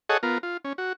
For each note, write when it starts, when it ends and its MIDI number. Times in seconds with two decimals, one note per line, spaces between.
0.09 0.18 68
0.09 0.18 69
0.09 0.18 73
0.09 0.18 75
0.09 0.18 78
0.23 0.38 59
0.23 0.38 65
0.23 0.38 70
0.43 0.57 65
0.65 0.73 61
0.78 0.93 66